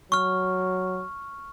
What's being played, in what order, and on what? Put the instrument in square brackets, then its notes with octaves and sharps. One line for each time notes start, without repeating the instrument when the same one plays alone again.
[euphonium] F#3 [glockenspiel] C#6 F6